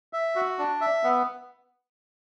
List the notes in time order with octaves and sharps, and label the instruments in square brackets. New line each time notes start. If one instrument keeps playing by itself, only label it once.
[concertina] E5
F#4
D4
E5
B3